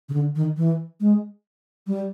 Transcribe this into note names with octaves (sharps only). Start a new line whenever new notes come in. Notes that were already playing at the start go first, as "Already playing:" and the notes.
C#3
D3
D#3
E3
G#3
G3